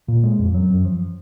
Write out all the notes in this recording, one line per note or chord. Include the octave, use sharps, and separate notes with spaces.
A#2
G#3
F2
F#3
F#2
F3